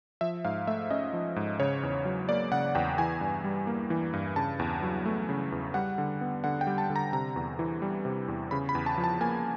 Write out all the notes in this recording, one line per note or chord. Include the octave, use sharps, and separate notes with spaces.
F3 E5
G#2 F5
A3 E5
C#4 D#5
F3
G#2
C#3 C#5
E2
F#3
A#3 D5
C#3 F#5
E2 G5
E3 G#5
G2
G3
A#3
E3
G2
C#3 A5
E2
F#3
A3
C#3
E2
G3 F#5
D3
B3
D3 F#5
G5
G3
A5
D3
A#5
C3 A#5
E2
E3
G3
C3
E2
C#3 B5
B5
E2
A5
F3
A5
A#3 G#5